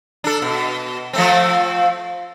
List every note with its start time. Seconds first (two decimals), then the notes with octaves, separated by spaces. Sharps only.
0.24 D4 A4
0.42 B2
1.13 F3 A3 C4